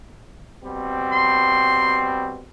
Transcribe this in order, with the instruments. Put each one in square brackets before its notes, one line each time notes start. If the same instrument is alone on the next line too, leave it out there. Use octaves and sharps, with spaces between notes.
[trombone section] B2 G3 C4
[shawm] C6